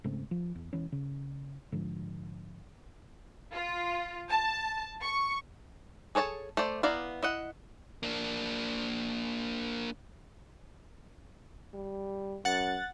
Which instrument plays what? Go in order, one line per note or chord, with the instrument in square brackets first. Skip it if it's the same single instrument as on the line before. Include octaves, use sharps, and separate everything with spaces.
[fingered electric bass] G#2 C#3 A3 C4
F3
E2
E1 E3 C#4
C#3
G#2 D3 F3
[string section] F4
A5
C#6
[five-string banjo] G#4 A4 C#5 D#5 A5
A3 C5 D5
B3 E4 D5 F5 A#5
E4 D#5 F#5
[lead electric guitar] A#3 D4
[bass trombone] G3
[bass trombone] F#2 [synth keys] F#5 A6